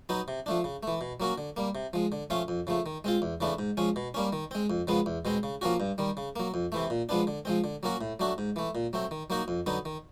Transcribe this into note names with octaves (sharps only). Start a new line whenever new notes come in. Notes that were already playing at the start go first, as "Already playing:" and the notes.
F#3 B3 D#4
C3
F3 A3 D4
C#3
E3 A3
B2
F#3 A#3 C#4 F#4
D3
G3 A#3
C3
F3 G#3
D3
F3 A3 C#4 F4
F2
C#3 F3 A3
D#3
G#3 C4 F4
E2
C#3 E3 A3 D4
G#2
F3 G#3 C#4
B2
G3 A#3 C#4
D#3
G#3 C4
F2
C#3 F3 G#3 B3
E2
B2 G#3 C4
C#3
F3 A#3 C#4 F#4
G2
D#3 G3
C#3
F#3 A#3
F2
C3 E3 A3
A#2
F3 G#3 B3 D4
D3
F3 G#3 C4
D3
F#3 A#3 C#4 F#4
A2
F#3 A3 D4 F#4
G#2
E3 A3
A#2
F#3 A3 C4
D#3
F#3 A#3 D#4 F#4
F2
D3 F#3 B3 D#4
D#3